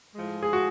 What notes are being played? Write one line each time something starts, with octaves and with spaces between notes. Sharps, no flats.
A2 F3 G#3
G#4
F#4